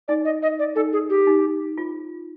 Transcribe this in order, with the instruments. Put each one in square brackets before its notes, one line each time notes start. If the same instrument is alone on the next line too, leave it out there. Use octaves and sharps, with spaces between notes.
[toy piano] D#4 [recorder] D5
[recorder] D#5
D#5
D5
[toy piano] D#4 [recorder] A4
[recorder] G#4
G4
[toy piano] D#4
F4